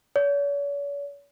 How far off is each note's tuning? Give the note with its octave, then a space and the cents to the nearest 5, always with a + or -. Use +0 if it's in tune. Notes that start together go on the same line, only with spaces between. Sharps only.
C#5 +45